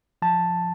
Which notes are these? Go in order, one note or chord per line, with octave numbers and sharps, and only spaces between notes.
F3 A5